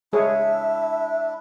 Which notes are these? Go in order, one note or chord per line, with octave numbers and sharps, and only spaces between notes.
G#3 D4 E4 G#4 C#5 E5